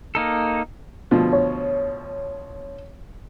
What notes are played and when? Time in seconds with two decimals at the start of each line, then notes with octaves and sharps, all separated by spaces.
0.15 A#3 D#4 A4
1.11 D2 B2 F3
1.33 C#5